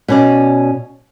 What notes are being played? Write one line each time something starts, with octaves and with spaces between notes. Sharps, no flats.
B2 C#4 D5